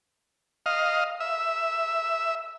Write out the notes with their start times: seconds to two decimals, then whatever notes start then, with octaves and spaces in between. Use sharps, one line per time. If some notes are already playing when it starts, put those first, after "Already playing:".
0.66 D#5 F5
1.20 E5